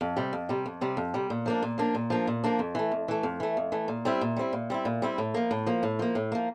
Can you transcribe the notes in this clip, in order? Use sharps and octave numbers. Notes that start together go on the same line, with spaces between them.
F2
C3 G3
F2
C3 G3
F2
C3 G3
F2
C3 G3
A#2
F3 A#3 D4
A#2
F3 A#3 D4
A#2
F3 A#3 D4
A#2
F3 A#3 D4
F2
E3 A3
F2
E3 A3
F2
E3 A3
F2
E3 A3
A#2
G3 C4 E4
A#2
G3 C4 E4
A#2
G3 C4 E4
A#2
G3 C4 E4
A2
F3 A#3
A2
F3 A#3
A2
F3 A#3
A2
F3 A#3